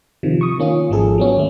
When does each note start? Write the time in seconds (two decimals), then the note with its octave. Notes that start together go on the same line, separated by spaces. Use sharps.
0.23 C3 D#3 F3
0.41 C#6 D#6
0.58 D#3 A#3 C#4 F4
0.90 G#1 F3 G#3 G#4 A4
1.18 F#3 B3 C#4
1.36 D#2 A3